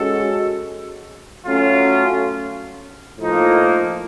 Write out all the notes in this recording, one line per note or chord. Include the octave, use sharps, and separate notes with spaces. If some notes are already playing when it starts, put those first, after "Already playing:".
Already playing: G#3 C#4 F#4 A4
F#3 A3 C#4 F4
A2 F3 A#3 D#4